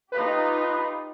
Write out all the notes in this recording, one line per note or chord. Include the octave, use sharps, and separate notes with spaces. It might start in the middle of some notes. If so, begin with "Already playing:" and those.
D#4 F4 G4 B4